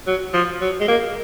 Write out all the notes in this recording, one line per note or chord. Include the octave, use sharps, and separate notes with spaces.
F#3
F3
F#3
G#3
A#3